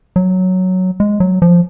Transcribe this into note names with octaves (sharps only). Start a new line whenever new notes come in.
F#3
G#3
F#3
F3